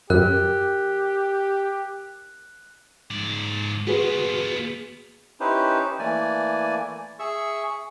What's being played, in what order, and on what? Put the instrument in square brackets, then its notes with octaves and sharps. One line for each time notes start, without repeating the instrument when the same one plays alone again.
[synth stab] F#2 [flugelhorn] G4 [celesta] A#4 [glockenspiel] F6 F#6
[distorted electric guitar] G#2 D5
[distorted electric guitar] B3 F4 [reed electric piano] F#4 G#4 B4
[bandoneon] C#4 D#4 E4 G4 B4 C5
E3 A3 A#3 D5 G#5
G#4 E5 C#6 E6